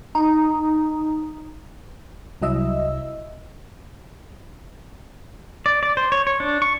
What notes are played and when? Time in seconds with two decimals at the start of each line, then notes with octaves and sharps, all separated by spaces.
0.15 D#4
2.42 C2 F#3 E4 D#5 E5 E6
5.66 D5
5.83 D5
5.97 C5
6.12 C#5
6.27 C#5
6.40 D4
6.62 C#6